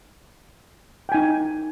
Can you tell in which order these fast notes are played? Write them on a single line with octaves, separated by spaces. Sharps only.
G5 G#5 D#4